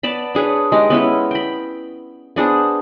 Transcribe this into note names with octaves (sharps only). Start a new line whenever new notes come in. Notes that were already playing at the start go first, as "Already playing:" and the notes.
B3 D5 A5 B5
D4 G#4 B4 C#5
G#3 D#4 G4
B3 C#4 E4 B4
G5 B5
B3 D4 G#4 C5